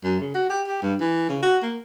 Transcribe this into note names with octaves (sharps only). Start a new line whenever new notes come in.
F#2
C#3
F#4
G4
G4
G2
E3
C#3
F#4
A#3